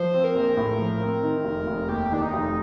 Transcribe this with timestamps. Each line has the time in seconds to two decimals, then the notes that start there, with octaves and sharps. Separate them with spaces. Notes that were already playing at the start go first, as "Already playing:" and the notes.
Already playing: F3 C5
0.14 C4
0.24 A#4
0.35 A#1
0.57 A2
0.78 F3
1.02 C4
1.23 D#3
1.45 F1
1.67 F1
1.88 D#2 G4
2.11 D#3 D4
2.22 D#4
2.33 F1